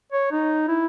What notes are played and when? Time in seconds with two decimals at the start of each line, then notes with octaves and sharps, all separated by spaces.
0.12 C#5
0.31 D#4
0.68 E4